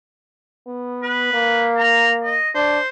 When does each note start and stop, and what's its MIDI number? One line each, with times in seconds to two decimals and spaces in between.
0.67 1.30 59
1.03 1.67 71
1.34 2.37 58
1.77 2.11 82
2.24 2.49 75
2.55 2.79 62
2.55 2.88 72